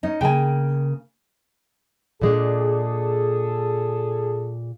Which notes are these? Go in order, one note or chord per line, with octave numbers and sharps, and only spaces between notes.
C#4 D#4
C#3 A#3 G5 G#5
A#2 G#3 D4 G#4 A4